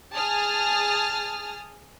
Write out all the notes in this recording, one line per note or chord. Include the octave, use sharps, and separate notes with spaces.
G#4 A5 D#6 F6